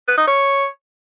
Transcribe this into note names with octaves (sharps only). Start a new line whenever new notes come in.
B4
D#4
C#5